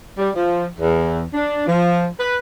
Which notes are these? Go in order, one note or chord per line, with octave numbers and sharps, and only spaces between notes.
G3
F3
E2
D4
F3
B4